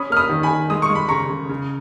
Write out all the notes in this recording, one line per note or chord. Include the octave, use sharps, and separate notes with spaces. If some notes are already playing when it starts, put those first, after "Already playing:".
Already playing: C#4 B5 D#6
A#3 F6
B5 D#6
D#3
G#5 B5
D#3
G#3 D#6
C#6
G#3
B5
C#3 A#5 C#6
C#3
C#3